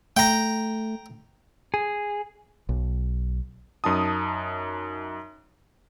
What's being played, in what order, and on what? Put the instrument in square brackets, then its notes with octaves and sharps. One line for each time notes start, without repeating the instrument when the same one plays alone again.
[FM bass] A3 [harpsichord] G5 A#5
[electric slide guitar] G#4
[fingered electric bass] B1
[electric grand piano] F#2 D#4 A5 D#6